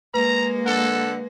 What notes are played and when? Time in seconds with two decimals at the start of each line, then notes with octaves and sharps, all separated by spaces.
0.14 G#3 A#3 B4 A#5
0.66 D3 A4 F#5